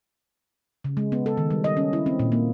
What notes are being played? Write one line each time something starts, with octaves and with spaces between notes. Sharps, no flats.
C#3
G#3
B3
A4
D#3
G3
D#5
C#4
E4
C4
A#2
A#3